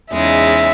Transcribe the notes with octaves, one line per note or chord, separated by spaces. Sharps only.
E2 C#3 G#3 D#4 E5